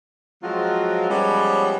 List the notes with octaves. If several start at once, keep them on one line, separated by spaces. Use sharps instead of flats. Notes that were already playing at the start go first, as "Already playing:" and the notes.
F3 F#3 G#3 C4 F4 F#4
F3 G3 G#3 B3 C#4 C#5